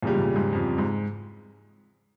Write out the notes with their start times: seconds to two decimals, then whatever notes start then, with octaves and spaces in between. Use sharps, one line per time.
0.03 E2 A#2 C#3 G3
0.14 G#2
0.19 A#2
0.36 G#2
0.53 F2
0.78 G#2